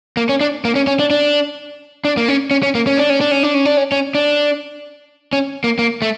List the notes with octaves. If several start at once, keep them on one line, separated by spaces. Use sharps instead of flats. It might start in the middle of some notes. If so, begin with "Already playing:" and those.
A#3
C#4
D4
A#3
C#4
C#4
D4
D4
D4
A#3
C#4
C#4
C#4
A#3
C#4
D4
C#4
D4
C#4
D4
C#4
D4
C#4
C#4
D4
C#4
A#3
A#3
A3